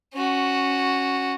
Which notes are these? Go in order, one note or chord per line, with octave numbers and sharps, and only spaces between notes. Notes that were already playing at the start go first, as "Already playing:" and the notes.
C#4 F#4